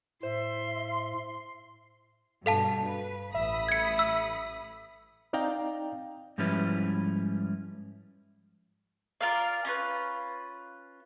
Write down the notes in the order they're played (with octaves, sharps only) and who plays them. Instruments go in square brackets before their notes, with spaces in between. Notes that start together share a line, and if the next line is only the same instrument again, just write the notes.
[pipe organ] A2 [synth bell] C5 [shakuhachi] E5 [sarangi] C6
[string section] G2 B2 [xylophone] A4 F5 A5
[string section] B4
[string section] A1 B5 D#6 [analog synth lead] E5
[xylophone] G#6 C#7
E6
[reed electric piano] C4 D#4 D5 F5 G5 A#5
[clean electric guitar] G#2 F3 G3 C#4 E4 B4
[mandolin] F4 A#4 D5 F5
C#4 F4 B4